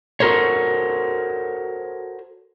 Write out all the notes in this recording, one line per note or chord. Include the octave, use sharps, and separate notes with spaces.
F#4 A4 A#4 C5 C#5